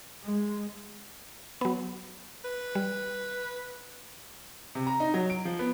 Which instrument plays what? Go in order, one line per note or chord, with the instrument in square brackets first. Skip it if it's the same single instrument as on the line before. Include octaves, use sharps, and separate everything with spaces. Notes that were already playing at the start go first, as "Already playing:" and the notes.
[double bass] G#3
[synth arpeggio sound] F#3 B3
[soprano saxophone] B4
[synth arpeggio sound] G3
[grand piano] C3
A#5
D#4
F#3
D7
F3
B3